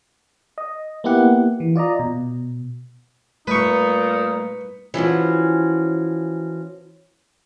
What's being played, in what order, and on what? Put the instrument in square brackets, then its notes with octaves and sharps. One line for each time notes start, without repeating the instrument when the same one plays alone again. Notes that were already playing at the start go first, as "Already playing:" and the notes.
[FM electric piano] D#5
A#3 B3 E4 G4 F#5
E3
F4 D5 D#5 A#5
B2
[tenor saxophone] A#2 [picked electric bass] G3 A3 [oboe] D#4 [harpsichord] B4 C#6
[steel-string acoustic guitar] E3 F3 C#4 F#4